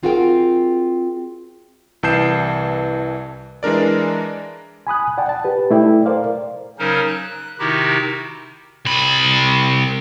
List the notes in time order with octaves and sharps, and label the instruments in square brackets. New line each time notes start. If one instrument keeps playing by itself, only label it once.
[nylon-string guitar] C4 F4 F#4 G#4 A#4 G5
[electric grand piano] C2 E3 A5 G6 C7 E7
E3 G#3 D4 A#4 D5
[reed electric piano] G#5 B5 D#6 F#6
D5 F#5 G5 A5
A5
G4 B4
A3 E4 D5 G5
A#4 C5 D5 F5
[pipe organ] C#3 F#3 C#4 D#4 A#4 C5
F#6
C3 D#3 D#4 E4 F#4 G4
[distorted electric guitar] C2 B5